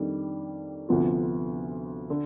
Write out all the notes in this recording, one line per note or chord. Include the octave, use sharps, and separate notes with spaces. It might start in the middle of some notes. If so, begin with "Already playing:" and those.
Already playing: F2 D#3 G3 D4
D2 C3 F3 B3 F4
D3